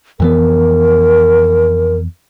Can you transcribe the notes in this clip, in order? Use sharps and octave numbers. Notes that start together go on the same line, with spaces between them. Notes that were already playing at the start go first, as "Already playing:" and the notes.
F2 E3 B3 A#4